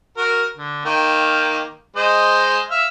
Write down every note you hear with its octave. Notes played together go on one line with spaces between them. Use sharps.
F#4 A#4
D3
D#3 A#3 G5
G#3 C5 D#5
E5 F5